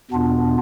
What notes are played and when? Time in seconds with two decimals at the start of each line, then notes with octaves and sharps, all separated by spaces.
0.11 E2 B2 B3 D4 F4